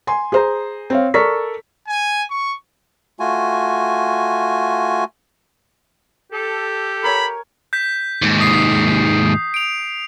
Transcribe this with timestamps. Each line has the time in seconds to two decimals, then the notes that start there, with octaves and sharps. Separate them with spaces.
0.07 G#5 C6
0.32 G#4 C5 A#5
0.90 C4 C#5 F5
1.14 A4 A#4 D5 C#6 B6
1.88 G#5
2.30 C#6
3.20 A3 F4 F#4 G#5
6.32 G4 A4
7.04 A#4 C#5 G#5 B5
7.73 G6 B6
8.22 D#2 G#2
8.41 D#6 C7
9.54 D7 F7